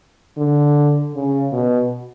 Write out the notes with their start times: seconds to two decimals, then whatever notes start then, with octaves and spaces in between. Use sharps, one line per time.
0.37 D3
1.15 C#3
1.52 B2